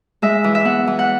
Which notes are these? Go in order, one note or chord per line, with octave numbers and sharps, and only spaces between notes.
G#3 E5
E3
E5
B3 F#5
E3
F#5